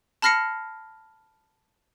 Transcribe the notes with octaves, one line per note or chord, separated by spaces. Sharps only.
A5 B5 F6 A#6 C7 C#7